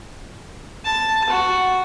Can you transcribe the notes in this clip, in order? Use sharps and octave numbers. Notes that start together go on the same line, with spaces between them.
A5
F#4